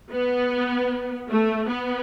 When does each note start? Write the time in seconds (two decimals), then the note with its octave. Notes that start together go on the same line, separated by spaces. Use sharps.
0.11 B3
1.29 A3
1.69 B3